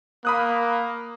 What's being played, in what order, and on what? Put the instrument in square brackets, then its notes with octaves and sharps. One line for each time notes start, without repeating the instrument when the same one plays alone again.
[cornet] A#3 [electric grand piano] B5 D#6 F#6